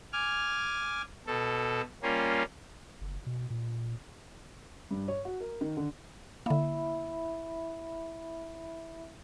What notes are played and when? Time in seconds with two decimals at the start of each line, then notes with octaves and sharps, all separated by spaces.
0.13 G#5 D6 F6
1.26 B2 A4
2.02 G3 A#3 C#4 F4
3.01 F#1
3.26 B2
3.50 A#2
4.91 G2
5.08 C#5
5.25 F#4
5.40 A#4
5.61 D#3
5.77 D3
6.46 D3 A#3 E4 E5 B5